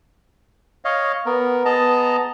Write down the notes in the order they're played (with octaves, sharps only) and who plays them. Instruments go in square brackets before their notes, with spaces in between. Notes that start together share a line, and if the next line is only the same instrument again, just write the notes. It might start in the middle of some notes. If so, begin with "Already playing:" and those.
[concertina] C#5 D#5 F5
B3 A#4
B3 G#4 D#5 A5 A#5